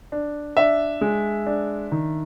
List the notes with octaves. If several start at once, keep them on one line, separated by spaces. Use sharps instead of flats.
D4
D4 E5
G#3
D4
D#3